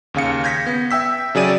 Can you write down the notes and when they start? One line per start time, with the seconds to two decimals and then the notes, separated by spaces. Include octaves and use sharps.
0.14 D#2 C#3 F5 C#7
0.44 G6 G#6 A#6 B6
0.66 B3
0.91 E5 G5 E6 B6
1.35 C#3 F#3 G#4 D5 D#7